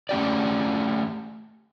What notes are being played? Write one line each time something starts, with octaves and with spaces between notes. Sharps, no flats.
A3 C#4 G4 D5